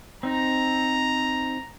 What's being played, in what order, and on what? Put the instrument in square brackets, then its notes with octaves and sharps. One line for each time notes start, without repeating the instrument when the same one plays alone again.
[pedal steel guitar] C4 D#4 [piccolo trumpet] A#5